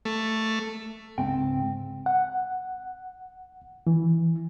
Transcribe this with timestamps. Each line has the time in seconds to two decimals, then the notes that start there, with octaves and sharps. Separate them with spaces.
0.05 A3
1.18 C#2 G#2 C4 G5
2.06 F#5
3.87 E3